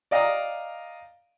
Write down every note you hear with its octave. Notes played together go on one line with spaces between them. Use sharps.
D5 D#5 F5 G5 A#5 D#6